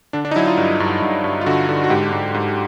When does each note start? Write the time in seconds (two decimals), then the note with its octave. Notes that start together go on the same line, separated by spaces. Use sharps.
0.13 D3 D4
0.25 D4
0.31 D#4
0.36 F#3 E4
0.47 F4
0.58 G2
0.80 G2
1.02 G2
1.24 G2
1.41 F4
1.46 D3 F#4
1.69 D3
1.84 F#4
1.90 G#2 G4
2.12 G#2
2.34 G#2